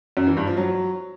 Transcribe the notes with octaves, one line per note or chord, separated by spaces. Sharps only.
F#2
E3
G2
F3
F#3